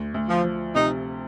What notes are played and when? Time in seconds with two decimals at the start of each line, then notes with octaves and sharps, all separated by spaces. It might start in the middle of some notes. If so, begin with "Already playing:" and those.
Already playing: D2
0.14 D2
0.29 F3
0.44 F3
0.75 C3 D#4